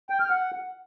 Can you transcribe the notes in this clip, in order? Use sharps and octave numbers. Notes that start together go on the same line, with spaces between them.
G5
F6
F#5